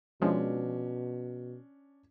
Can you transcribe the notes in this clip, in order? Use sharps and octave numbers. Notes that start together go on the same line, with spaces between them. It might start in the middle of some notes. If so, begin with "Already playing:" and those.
B2 F3 G#3 C#4 D4